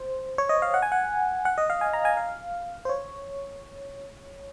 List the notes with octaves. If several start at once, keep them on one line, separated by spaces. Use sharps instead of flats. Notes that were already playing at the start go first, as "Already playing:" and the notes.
Already playing: C5
C#5
D#5
F5
F#5
G#5
F#5
F#5
D#5
F5
G#5
A#5
G#5
F5
C5
C#5